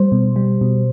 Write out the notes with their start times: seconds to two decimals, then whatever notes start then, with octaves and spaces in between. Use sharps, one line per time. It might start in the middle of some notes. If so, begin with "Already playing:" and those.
Already playing: G3 C5
0.12 B2
0.36 G3
0.61 B2